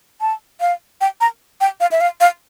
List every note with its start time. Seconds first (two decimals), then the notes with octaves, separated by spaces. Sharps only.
0.21 A5
0.61 F5
1.01 G5
1.21 A#5
1.61 G5
1.80 F5
1.91 E5
2.01 F5
2.20 F5